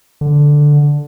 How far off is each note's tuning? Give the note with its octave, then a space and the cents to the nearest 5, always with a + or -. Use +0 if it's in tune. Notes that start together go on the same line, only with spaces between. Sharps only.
D3 +0